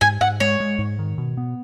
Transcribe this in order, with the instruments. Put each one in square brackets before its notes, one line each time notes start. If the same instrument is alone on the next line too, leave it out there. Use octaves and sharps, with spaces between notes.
[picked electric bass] G#2 [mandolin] G#5
[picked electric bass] G#2 [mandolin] F#5
[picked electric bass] G#3 [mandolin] C#5
[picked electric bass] G#3
G#2
D#3
B2
B3